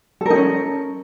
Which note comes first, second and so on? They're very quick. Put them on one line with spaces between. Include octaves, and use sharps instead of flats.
A4 A#4 D#4 C#4